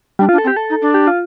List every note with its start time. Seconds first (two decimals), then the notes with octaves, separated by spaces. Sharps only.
0.19 G3 D4
0.29 F4
0.32 D4
0.38 A4
0.44 C4
0.47 G4
0.56 A4
0.70 D#4
0.82 D4
0.94 G4
1.07 F4